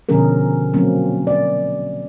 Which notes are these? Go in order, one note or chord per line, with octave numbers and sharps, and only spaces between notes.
B2 D3 F3 C#4 G#4 A#4
F#3 A#3 C4 C#4
D5